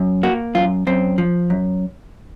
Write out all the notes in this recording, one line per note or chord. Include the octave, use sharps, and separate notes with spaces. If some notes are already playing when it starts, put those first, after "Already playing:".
Already playing: F#2
A#3 F#4
F#2 F4
F#2 C4
F3
F#2